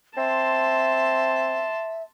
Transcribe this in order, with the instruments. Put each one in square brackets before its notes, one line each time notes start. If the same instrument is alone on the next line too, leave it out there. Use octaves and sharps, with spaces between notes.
[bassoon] C4 [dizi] E5 [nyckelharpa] A5 C6